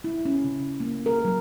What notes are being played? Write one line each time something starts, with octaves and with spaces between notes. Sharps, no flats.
E4
C#4
C#3
A#3
A#4
F#3